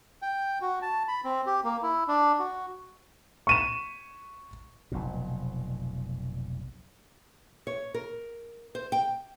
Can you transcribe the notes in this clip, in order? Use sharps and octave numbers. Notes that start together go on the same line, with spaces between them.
G5
F#4
A5
B5
C4
G4
A#3
E4
D4
F#4
C#6 D#7 E7
F1 B1 F2 A#2
C#5
A#4
C5
G5